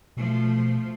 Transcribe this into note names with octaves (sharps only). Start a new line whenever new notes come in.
B2 F3 A3